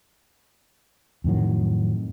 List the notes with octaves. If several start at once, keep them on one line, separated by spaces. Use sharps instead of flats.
F2 A2 D#3 F#3